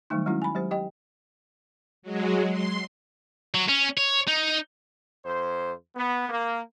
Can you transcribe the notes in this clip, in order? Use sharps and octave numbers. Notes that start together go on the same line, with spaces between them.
D#3 F#3 G3 A3 D#4
F#3 G#3 C#4 E4 F#4
G#5 B5
F#3 G#3 G4 C5
G4 D#5 G5
F#3 G#3
C6
F#3
C#4
C#5
D#4
F2 C5
B3
A#3